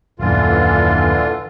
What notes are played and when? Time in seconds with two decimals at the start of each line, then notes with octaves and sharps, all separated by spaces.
0.19 D#1 F#2 A#2 D3 E3 F4